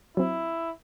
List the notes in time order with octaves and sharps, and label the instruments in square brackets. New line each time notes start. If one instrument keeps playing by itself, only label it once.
[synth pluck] F#3 C4 [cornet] E4